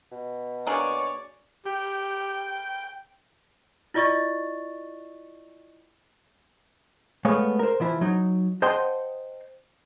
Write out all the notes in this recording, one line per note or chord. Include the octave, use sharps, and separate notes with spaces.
B2
A#3 D4 G#4 C#5 D5
G4 G5
E4 F4 D5 D#5 C#6 A6
G#3 A3 B3 C#5 F5
A#4 C5
E3 F3 E4
F#3 D#4
C5 D#5 F#5 G5 A5 C6